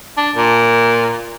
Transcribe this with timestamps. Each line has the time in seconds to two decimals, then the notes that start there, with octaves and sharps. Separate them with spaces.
0.17 D4
0.36 A#2